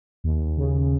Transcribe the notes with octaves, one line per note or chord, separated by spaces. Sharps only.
D#2
C#3